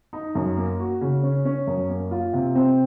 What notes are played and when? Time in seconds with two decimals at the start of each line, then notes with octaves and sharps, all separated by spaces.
0.13 D#4
0.35 F#2
0.57 A#3
0.79 F#4
1.01 C#3
1.23 C#4
1.45 C#4
1.67 F#2
1.89 A#3
2.11 F4
2.33 C3
2.55 C4